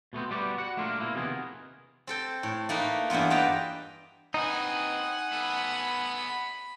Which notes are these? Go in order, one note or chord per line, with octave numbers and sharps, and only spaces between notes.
B2 A3 B3 C4
G3 B3 F#4 G4 B4 D5
F#4 F#5
A3 A#3 D4 F4 A#4
B2 A#3 E4
C3 D#3 F3 B3 G#4 A#4
C4 A4 G5
A2
A3 A#3 D#4 B4
E2 G2 A#3 B3 F4
B4 D5 D#5 G5 A5 A#5
C4 D#4 B4 F#5 G#5
B3 A4 B5